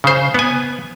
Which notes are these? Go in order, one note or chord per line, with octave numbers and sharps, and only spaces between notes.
C#3 C5
B3 G#5